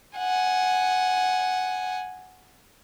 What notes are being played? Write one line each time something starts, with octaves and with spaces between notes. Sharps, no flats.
F#5 G#5